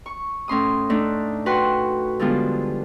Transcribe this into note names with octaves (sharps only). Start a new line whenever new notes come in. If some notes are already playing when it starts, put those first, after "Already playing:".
C#6
A2 C#4 C6 D#6
A3 D4 D#4
F#4 B4 F#5 G5 C6 C#6
D3 F3 G3 G#3 B3 F4